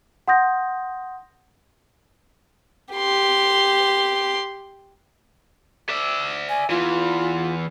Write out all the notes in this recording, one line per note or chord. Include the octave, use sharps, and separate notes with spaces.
F#5 C6 D#6 G6 A#6
G4 C6
D5 E5
G#5
E2 E3 F4